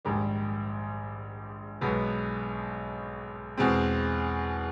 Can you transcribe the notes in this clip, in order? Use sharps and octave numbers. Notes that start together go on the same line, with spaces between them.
A#1 G#2 D#3 G3
B1 B2 G#3 B3
E2 B2 G#3 C4